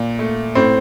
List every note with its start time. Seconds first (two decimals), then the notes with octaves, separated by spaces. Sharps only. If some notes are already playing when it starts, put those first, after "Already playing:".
Already playing: A#2
0.19 A3
0.55 A2 C4